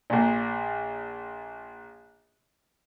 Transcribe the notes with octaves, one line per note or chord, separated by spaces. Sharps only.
A#1 A#2